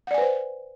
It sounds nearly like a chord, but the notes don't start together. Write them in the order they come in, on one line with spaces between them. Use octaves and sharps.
F#5 D5 G#5 B4 C5